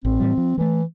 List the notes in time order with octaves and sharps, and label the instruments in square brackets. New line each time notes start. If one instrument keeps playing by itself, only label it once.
[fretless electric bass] A1 [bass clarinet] C4
[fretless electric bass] A2 E3 G3
F3
[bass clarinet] E3 [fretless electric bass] G#3 A3